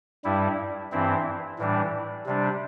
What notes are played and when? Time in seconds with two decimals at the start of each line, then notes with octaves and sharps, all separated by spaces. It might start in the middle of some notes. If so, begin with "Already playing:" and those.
0.24 G2 G3 E4
0.92 G2 E3 C4 E4
1.59 A2 E3 G3 D4
2.26 C3 G3 D4